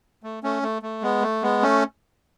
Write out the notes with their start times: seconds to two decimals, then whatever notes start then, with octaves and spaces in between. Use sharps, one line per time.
0.23 A3
0.43 A3 C#4
0.63 A3
0.82 A3
1.02 G#3 B3
1.22 A3
1.43 G#3 B3
1.63 A3 C#4